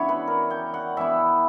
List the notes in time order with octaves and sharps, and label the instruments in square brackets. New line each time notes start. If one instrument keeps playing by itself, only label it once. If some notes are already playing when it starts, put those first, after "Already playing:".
Already playing: [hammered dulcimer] C#3 E3 B3 D4 C#5 E5
B4
A#4
G5
F#5
E3 B3 E4 E5